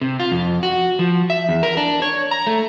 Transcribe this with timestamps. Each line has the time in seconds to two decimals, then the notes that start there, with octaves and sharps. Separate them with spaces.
0.01 C3
0.20 F4
0.32 F2
0.63 F#4
0.99 F3
1.30 E5
1.49 E2
1.63 A#4
1.77 D4
2.02 C#5
2.31 A#5
2.47 A3